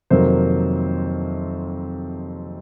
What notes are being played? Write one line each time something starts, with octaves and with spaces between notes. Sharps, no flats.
F2 C3 D#3 F#3 A#3 C5